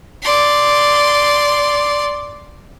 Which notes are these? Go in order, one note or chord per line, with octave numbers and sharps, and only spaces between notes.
D5 C6